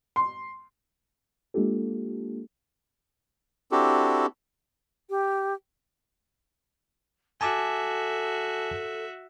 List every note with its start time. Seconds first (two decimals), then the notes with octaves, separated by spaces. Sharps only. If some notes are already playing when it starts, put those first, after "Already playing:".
0.16 C6
1.54 G#3 A#3 D4 F4 G4 A4
3.72 C4 D4 E4 F#4 G4 A4
5.10 G4
7.41 F#4 A4 E5 G#5 A5 D6